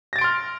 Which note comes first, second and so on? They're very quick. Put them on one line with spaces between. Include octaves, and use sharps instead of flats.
A#6 A6 D7 C6 F6